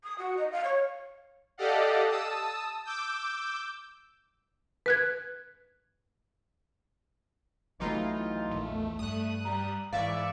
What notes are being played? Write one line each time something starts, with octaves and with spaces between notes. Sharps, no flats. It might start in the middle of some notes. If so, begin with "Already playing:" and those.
D#6
F#4
D#5
F5
C#5
G4 A4 D5 D#5 F5 F#5
A5 D#6 E6
D6 E6 G6
B4 F#6 G#6
B1 E3 F#3 A3 D#4 F4
A#1 E2 A3
G2 D#6 F#6
G3 A#5
G#2 E3 D5 E5 F5 C#6